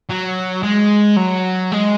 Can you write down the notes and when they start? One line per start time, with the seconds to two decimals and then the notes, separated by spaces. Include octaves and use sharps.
0.09 F#3
0.63 G#3
1.17 F#3
1.72 G#3